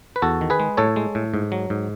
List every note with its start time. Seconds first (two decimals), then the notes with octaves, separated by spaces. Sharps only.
0.16 B4
0.22 E2 F#4 A4
0.41 D#3
0.50 G#4 B4
0.60 G#3
0.77 A2 A4 C#5
0.96 G#3
1.15 A2
1.34 G#2
1.52 F#3
1.70 G#2